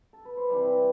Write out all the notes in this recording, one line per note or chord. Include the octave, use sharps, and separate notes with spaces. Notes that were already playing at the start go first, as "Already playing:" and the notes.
Already playing: G4
A4
B4
C5
C3 E3 G3 B4 D5